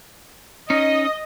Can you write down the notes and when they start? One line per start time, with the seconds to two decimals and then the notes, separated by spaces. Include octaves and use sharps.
0.70 C#4 D#4 D#5